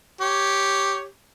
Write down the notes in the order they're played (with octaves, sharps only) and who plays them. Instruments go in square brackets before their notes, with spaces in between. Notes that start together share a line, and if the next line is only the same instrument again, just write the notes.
[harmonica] G4 C#5